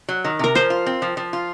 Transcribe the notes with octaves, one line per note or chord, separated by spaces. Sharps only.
F#3
D#3
C3 A#4
F3 C5
F4
C4
F3
F3
F4